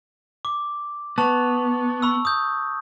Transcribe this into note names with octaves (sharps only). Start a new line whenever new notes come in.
D6
B3 A5 C#6 F7
B5 C#6 E6
D#6 G6